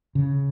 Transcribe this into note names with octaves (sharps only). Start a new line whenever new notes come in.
C#3